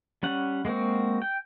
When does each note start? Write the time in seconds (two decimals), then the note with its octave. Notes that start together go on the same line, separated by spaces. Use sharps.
0.23 G3 C#4 F#5
0.65 G#3 A#3 C4 F#4
1.22 G5